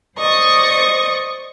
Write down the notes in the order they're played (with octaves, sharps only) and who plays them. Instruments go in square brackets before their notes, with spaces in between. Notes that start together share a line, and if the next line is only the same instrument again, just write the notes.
[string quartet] C5 D5 D#5 C#6 D#6